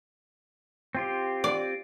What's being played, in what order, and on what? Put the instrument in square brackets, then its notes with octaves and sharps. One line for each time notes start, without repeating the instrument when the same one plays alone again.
[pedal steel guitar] C4 F4 G4
[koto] D5